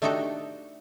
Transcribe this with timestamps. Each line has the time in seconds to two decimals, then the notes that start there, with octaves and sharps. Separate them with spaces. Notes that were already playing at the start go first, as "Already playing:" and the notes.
0.02 A3 D4 D#4 F#4 G4 A4